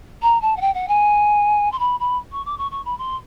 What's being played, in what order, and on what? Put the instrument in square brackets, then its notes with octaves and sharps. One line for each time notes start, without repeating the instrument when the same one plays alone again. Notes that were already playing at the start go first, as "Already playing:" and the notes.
[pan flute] A#5
A5
F#5
G5
F#5
G#5
C6
B5
B5
C#6
D6
C#6
C#6
B5
C6